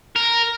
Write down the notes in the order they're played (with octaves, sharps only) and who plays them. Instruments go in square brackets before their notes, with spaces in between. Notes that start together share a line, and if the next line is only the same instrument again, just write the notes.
[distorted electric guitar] A#4